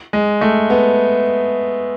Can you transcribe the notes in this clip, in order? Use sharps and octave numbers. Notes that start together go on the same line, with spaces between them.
G#3
A3
B3